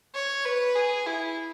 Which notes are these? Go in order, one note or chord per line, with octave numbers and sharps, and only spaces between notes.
C#5
B4
G#4
E4